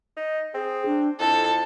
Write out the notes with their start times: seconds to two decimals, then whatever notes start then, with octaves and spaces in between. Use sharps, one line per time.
0.17 D#4
0.54 C4 G#4
0.86 D4
1.20 F2 E4 A4